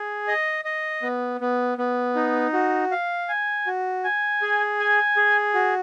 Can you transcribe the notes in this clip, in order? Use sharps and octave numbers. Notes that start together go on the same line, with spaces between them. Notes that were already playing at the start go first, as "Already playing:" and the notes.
Already playing: G#4
D#5
D#5
B3
B3
B3
D#4
F#4
F5
G#5
F#4
G#5
G#4
G#5
G#4
F#4